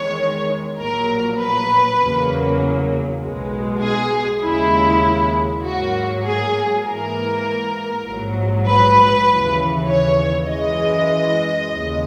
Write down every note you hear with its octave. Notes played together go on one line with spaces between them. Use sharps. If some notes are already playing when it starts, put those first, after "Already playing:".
Already playing: E2 D#3 G#3 C#5
A#1 A#2 F#3 A#4
B4
E2 C#3 F#3 A#3
B1 B2 G#3
G#4
D#2 C#3 G#3 E4
G#2 F#3 A#3 F#4
G#4
G#2 E3 A#3 A#4
A#1 G#2 F#3
B4
D#2 C#3 E3
C#5
F#2 E3 G#3 D#5
D#2 C#3 G#3